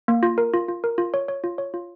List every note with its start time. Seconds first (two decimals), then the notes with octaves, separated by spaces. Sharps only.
0.08 A#3
0.23 F4
0.38 A#4
0.53 F4
0.68 F4
0.84 A#4
0.98 F4
1.14 C#5
1.28 C#5
1.44 F4
1.58 C#5
1.74 F4